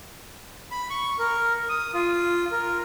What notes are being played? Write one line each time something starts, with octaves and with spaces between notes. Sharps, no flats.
B5
C#6
A#4
D#6
F4
A#4